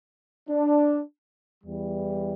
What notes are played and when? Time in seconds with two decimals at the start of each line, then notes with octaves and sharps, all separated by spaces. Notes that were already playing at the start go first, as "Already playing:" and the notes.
0.49 D4
1.64 E2 E3 G3